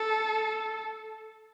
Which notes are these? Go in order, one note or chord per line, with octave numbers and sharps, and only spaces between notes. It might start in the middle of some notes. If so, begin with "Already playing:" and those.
Already playing: A4